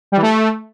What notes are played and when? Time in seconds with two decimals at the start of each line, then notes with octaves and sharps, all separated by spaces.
0.12 G3
0.17 E3
0.22 A3